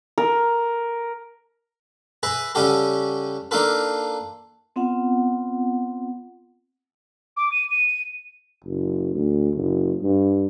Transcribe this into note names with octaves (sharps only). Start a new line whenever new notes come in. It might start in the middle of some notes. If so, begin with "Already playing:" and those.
A#4
G#4 B4 D#5 E5
C#3 G3 C#4 F#4 G4 A4
A#3 D4 D#4 F4 A4 B4
B3 C4 F4 F#5
D6
D#7
D#7
F#1
D2
F#1
G2